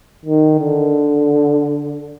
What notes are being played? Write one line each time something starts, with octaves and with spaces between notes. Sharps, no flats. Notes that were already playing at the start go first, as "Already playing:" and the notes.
D#3
D3